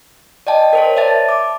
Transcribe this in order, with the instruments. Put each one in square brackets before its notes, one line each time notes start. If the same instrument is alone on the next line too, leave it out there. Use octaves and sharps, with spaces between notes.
[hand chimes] D5 D#5 G5 A5
A#4 C5 C#5
D5 E5 A5 A6
D6